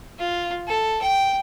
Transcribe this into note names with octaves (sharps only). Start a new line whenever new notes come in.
F4
A4
G5